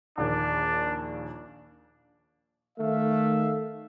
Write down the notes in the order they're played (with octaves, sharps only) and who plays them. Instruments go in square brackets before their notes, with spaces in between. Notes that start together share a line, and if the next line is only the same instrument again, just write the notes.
[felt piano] A#1 D#2 [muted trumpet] D4
[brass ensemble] D#3 E5 F5 [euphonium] A3